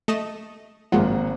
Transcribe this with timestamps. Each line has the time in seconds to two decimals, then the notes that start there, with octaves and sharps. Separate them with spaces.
0.08 A3 D#5 E7
0.92 G#1 F3 F#3 G#3 A#3 F#5